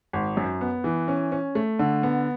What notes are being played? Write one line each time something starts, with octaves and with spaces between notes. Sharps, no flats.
G#1
F#2
B3
E3
C#4
C#4
A3
D3
B3